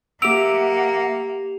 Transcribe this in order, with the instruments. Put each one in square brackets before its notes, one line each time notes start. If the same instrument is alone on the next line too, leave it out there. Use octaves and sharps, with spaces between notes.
[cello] A#3 [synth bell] G4 E7 F7 [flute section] E5 F#5 [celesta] E6 D7